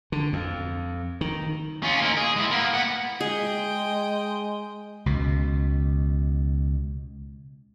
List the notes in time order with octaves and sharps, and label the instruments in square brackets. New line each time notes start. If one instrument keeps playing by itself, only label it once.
[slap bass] D3
F2
D#3
[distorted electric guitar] C#4 F4
A#3 D#4
G#4
G#3 E4
A#3 B3
B3 F#5
[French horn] G#3 [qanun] G#4 [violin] D#5 G5
[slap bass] C#2 B2